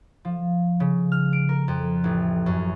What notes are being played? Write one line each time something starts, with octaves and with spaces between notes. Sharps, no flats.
F3
C#3
F6
D7
A#4
F2
A1
F#2